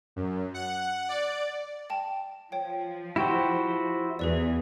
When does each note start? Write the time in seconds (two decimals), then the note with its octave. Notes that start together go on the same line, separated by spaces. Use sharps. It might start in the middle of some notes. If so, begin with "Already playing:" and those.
0.16 F#2
0.54 F#5
1.09 D5
1.90 G5 A5
2.52 F3 C#5 G5
3.16 E4 F#4 G4 C5 G5
4.19 E2 E3 G#4 B4 D5